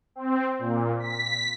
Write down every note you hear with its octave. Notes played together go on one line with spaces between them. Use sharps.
C4
A#2
B6